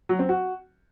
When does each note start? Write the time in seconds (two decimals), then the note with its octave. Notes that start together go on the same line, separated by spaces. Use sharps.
0.09 F#3
0.19 C4
0.29 F#4